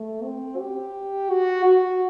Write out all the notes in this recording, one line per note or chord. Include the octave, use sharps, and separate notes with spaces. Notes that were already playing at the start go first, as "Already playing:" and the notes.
Already playing: A3
C4
G4
F#4
F#4